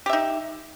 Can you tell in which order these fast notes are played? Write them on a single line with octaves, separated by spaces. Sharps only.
G4 E5 D#4